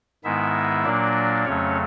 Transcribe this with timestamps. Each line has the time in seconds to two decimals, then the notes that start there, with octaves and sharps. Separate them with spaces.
0.24 G#2 D#3 G#3 B3 E4 E5
0.85 A#2 F#3 A#3 D4 D5
1.45 F2 C#3 F#3 A3 C#4 C#5